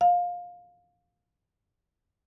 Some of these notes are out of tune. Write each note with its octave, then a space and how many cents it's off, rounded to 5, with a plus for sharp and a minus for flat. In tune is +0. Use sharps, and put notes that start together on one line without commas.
F5 +20